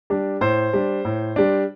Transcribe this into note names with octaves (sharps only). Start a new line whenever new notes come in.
G3 D4
A2 C5
G3 D4
A2
G3 D4